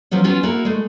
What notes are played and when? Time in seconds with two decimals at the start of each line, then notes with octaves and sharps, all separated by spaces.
0.11 F3 F#3 B3 C#4
0.24 F#3 B3 C#4 F4 F#4
0.43 A#3 E4 F#4 A#4
0.65 G#3 A3